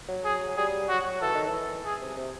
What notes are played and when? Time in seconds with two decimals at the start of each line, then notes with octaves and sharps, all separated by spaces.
0.08 F#3
0.25 G#4
0.49 F#3
0.57 G3 G#4
0.88 F#3 F#4
1.05 F#3
1.21 E3 A4
1.34 D#3
1.48 E3
1.85 G#4
2.01 C3
2.17 C3